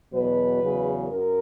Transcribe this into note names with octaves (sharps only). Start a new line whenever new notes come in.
E2 B2 F#3 B4
E2 C#3 F#3
F#2 A#4